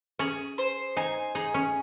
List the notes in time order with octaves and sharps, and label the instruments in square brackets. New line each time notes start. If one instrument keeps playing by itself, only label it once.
[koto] C#4 [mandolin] G#4
[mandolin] C5
[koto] D#4 [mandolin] G#5
[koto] D#4 [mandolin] G#4
[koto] C#4